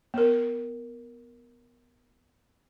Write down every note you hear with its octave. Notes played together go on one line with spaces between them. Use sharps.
B3 A#4